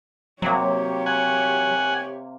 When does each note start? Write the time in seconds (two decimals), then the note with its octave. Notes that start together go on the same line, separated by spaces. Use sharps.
0.42 C3 F#3 A#3 G4 C#5
1.06 F#5 G#5